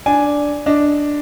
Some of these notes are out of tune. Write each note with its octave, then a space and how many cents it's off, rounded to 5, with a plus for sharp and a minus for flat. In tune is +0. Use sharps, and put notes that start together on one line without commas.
D4 -5 G#5 +0
D4 +0 D#5 +0